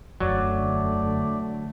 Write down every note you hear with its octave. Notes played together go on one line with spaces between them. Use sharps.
E1 F#2 D3 F#3 A3 D5